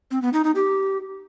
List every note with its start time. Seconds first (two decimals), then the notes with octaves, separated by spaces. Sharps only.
0.11 C4
0.22 B3
0.33 D#4
0.44 D#4
0.55 G4